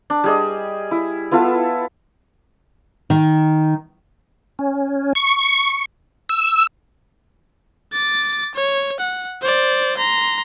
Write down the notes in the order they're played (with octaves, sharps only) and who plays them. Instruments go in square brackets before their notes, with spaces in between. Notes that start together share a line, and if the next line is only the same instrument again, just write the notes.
[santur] D4
G3 G#4 D#5
E4
B3 E4 F4 A4
[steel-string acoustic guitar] D#3
[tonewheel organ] C#4
C#6
E6
[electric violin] D6 A6
C#5
F#5
C5 D5
A#5 C6